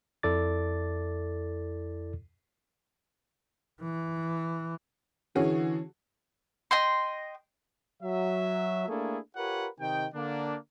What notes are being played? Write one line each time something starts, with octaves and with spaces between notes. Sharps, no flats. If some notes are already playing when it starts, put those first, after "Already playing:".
F2 E4 A4 D5 D6 A6
E3
D3 E3 C#4 F#4 G#4
D#5 G5 C6
F#3 E5
A3 A#3 D4 E4 G#4 A4
F4 G4 A#4 B4 C#5 F#5
C3 D#3 D#5 G5
D3 A#3 D4